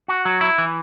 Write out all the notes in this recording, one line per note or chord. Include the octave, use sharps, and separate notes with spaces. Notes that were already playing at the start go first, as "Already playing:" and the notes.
F#4
F#3
E4
E3